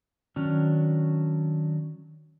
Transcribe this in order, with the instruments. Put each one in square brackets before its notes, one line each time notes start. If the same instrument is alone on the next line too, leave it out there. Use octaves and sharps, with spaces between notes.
[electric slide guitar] D#3 F#3 C#4 D4